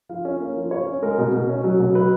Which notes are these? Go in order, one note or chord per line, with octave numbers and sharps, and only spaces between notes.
F3 F5
C#4
A#3
F3
F4 C#5
C#4
G#3 A#4
B2
B2
C#4
F#3
B2
F#3 B4